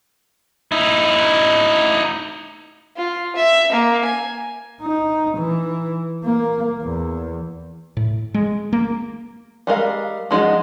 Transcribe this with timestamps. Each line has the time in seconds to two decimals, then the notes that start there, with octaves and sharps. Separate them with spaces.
0.72 D#4 E4
2.96 F4
3.36 E5
3.72 A#3
4.05 G#5
4.82 D#4
5.38 E3
6.24 A#3
6.82 E2
7.97 A2
8.34 G#3
8.73 A#3
9.67 G3 G#3 A#4 F5
10.31 F3 G#3 D#4 F#4